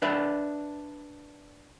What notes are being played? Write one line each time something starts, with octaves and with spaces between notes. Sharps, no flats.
D4 B4 D5 E5